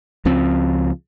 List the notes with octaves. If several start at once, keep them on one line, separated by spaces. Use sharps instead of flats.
C#2 F3 C4